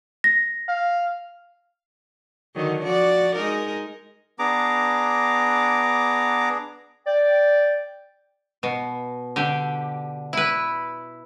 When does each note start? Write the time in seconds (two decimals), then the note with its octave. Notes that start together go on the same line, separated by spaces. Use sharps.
0.24 A#6
0.68 F5
2.56 D3 D#3 F#3
2.84 F3 F#4 D5
3.35 G#3 D#4 A#4
4.39 B3 D4 G#4 A#5 D6
7.06 D5 G5
8.63 B2
9.36 D3 G4
10.33 E4 B4